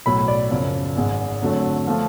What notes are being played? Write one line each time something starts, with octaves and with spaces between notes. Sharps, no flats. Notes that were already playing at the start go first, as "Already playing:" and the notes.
B1 A2 F#3 B5
D5
F#1 F#2 F3
G#1 G#2 G#3
F2 D3 F#3 A3
F3 A3 F4